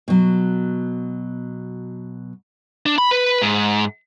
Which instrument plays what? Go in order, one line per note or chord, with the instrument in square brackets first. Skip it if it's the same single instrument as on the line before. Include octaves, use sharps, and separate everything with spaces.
[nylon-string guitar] B2 F#3
[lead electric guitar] D4
B5
B4
G#2